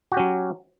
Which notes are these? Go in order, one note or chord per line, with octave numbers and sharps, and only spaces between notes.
F#3 C#4 F#4 G4